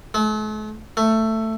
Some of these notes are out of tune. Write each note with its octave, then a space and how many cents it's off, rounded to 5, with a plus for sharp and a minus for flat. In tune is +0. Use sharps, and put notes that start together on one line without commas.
A3 -45
A3 +10